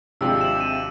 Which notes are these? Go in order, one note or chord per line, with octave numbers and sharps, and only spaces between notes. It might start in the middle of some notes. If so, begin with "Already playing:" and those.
G#1 C3 F3 G#3 D4 G4 E6
E7 F#7
D#7 E7